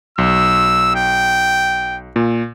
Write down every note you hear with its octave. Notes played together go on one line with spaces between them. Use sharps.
B1 E6
G5
A#2